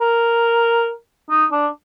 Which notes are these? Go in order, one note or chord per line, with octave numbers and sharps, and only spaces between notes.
A#4
D#4
D4